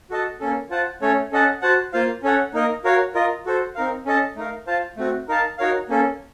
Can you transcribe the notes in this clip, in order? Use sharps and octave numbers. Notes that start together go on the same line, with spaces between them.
F#4 A4 D#5 A5
A#3 C#4 A4
F4 C5 F#5 A5
A3 C#4 A4 C#5
C#4 A4 D#5 F#5 A5
F#4 C5 F#5 A5
A#3 F4 C5 F5
C#4 A4 C#5 F#5
A#3 D#4 A#4 D#5
F#4 A#4 C#5 F5
F4 A#4 D#5
F#4 A4 C5
C4 D#4 A#4 F5
C#4 A4 D#5 A5
A3 D#4 A#4 F5
F4 C5 F5 A5
A3 C4 F#4
D#4 A#4 F5 A5
D#4 F#4 A#4 C#5 F5
A#3 C#4 A4